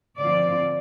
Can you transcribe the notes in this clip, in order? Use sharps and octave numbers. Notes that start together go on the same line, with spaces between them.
D3 F3 C4 F4 D5